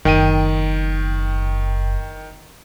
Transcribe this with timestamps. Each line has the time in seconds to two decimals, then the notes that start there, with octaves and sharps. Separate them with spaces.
0.05 F#1 D#3 G5 D#7